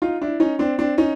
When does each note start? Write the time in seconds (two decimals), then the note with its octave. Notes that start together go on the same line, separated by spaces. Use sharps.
0.02 D#4 F4
0.21 D4 E4
0.40 C#4 D#4
0.59 C4 D4
0.79 C4 D4
0.98 C#4 D#4